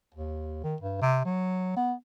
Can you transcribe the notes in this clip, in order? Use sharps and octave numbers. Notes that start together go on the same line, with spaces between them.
D#2
D#3
G2
C3
F#3
B3